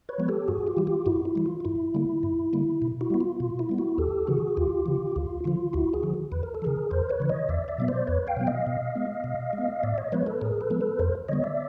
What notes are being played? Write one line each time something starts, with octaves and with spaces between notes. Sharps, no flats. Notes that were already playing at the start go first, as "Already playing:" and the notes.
B4 C#5
F3 G#3 B3
G4 A4
G2 F#4 G#4
F4 G4
E3 G3
F4 G4
G2 E4 F#4
E4
E3 G3
F4
F4
G2 E4
D3 G3 A#3
G2
D3 G3 A#3
B2
E4 F#4
G3 B3
F4
B2 F4
E4
G3 B3
E4 F#4
D#2 G4 A4
C#3 E3 F#4 G#4
D#2 F4 G4
C#3 E3
D2 F4
D3 F3 F4
D2 E4 F#4
F#4 G#4
D3 F3
E2 B4
A#4
A4
C#3 E3 G#4 A#4
E2 A#4 C5
B4 C#5
C#3 E3
C#5 D#5
E2 D5 E5
D5 E5
B2 F#3 B3
C5 D5
E2 B4 C#5
F5 G5
B2 F#3 B3
D#5 F5
B2
G#3 B3
B2
G#3
B3
A2 D5 E5
C#5 D#5
F3 G#3 B3 B4 C#5
A4 B4
A2 G#4 A#4
A4 B4
F3 G#3 B3
A4 B4
F2 A#4 C5
D3 G3 B3 C#5 D#5
D5 E5